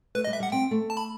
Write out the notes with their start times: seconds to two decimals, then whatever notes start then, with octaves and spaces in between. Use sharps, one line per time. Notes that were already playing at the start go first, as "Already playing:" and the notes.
0.15 A3 B4
0.24 D#5
0.27 G3
0.33 E5
0.40 G3 F#5
0.52 C4 G5
0.71 A3
0.90 A5
0.97 B5